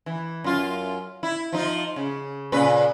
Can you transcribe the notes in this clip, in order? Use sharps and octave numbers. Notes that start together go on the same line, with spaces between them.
E3
F#2 F4
E4
F3 D#4 F4
C#3
A#2 C#3 B4